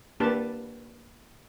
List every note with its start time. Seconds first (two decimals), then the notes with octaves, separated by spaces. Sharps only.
0.20 A#3 D4 G4 B4 A5